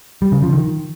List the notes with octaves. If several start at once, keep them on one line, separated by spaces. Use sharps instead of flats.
G3
C#3
F3
D#3